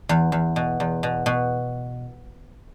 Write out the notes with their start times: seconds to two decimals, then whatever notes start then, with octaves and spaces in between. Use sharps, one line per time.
0.09 E2
0.32 E2
0.56 B2
0.80 E2
1.03 B2
1.26 B2